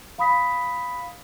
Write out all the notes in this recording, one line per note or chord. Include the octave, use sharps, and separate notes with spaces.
F5 B5 D#6 B6